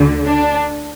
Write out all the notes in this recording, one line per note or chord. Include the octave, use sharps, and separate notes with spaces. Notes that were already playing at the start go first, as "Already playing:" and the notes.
Already playing: D2 D3
D4